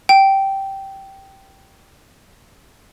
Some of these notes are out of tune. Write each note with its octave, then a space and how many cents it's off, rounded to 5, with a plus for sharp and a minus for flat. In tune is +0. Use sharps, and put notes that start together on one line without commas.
G5 -10